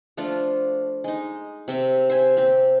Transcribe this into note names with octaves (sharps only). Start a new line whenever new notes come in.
F3 A3 D4 F4
G#3 D#4
C3 E5 C6
C5 E5 G#5
C4 G4